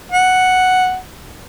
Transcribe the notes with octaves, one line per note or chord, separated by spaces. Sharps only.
F#5